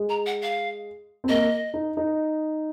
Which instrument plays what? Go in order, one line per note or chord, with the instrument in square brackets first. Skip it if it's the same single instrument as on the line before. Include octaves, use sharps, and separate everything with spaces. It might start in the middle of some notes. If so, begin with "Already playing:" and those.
Already playing: [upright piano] G#3
[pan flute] A#5
F#5
F5
[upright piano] C4
[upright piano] A#3 [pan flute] D#5
[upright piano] D#4
D#4